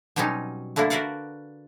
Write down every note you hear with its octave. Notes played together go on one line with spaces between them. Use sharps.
B2 F#3 G3 C4 C#4 D#4
D3 A3 A#3 D4 E4
F#4 A#4 B4 D5 F5 F#5